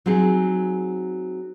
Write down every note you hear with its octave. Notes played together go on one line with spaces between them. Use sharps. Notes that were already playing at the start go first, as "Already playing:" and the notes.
F#3 C4 D#4 G#4